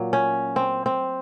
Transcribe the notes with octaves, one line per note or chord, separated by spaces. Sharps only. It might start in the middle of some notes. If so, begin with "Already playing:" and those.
Already playing: A#2 F#3
C#4
C4
C4